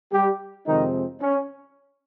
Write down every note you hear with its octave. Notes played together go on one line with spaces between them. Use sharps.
G3 G4
F2 C3 D#3 F3 G#3 C4 D#4
C#4